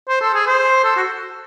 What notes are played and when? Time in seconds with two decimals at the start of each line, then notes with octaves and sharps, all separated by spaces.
0.09 C5
0.22 A4
0.34 G#4
0.47 C5
0.84 A4
0.97 F#4